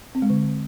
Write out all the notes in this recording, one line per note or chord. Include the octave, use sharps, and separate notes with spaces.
C4
G#3
D3